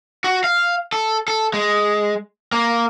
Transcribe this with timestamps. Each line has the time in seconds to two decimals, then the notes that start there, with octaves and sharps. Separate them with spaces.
0.24 F#4
0.44 F5
0.93 A4
1.28 A4
1.54 G#3
2.52 A#3